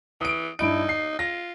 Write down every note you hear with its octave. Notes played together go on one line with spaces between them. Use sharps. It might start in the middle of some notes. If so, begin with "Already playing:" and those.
E3 D#6 D7
G2 D#4 E4 D7
C7
F4 A#6